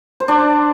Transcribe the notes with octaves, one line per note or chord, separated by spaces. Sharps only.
C5
D4 D5